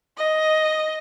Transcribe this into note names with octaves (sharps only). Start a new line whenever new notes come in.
D#5